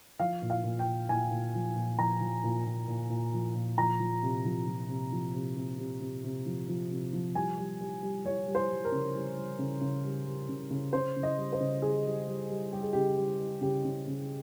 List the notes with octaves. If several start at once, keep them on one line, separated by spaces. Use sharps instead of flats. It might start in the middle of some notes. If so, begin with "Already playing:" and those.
F3 F5
A#2
F5
A#2
G5
A#2
A#2 G#5
A#2
F3
A#2
F3 A#5
F3
A#2
A#2
A#2
A#2
F3
A#2
F3 A#5
F3
C3
F3
F3
C3
F3
C3
C3
C3
C3
C3
F3
F3
C3
F3
G3 G#5
G3
G3
G3
G3 C#5
G3
C5
G3
A#4
C#3
G3
G3
C#3
C#3
G3
G3
C#3
C#3
C#3 C5
C#3
D#5
G3
C5
C#3
G3 G#4
G3
G3
G3
G3 G4
G#4
C#3 G4
G3
G3
C#3 G4
C#3
C#3